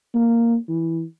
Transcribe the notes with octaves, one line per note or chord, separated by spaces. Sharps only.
A#3
E3